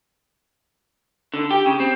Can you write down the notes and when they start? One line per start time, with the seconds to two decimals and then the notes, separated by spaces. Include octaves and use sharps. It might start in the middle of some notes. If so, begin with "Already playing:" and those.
1.34 D3
1.51 G4
1.66 C#3
1.80 C4